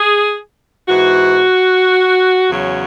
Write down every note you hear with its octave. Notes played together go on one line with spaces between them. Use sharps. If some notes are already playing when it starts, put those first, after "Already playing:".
Already playing: G#4
G#2 E3 F#4
E2 C#3 F#3